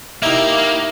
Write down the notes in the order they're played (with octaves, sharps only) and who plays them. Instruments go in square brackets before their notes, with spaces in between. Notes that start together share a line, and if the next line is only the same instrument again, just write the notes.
[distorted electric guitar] A#3 [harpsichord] D#4 E5 [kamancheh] E4 G4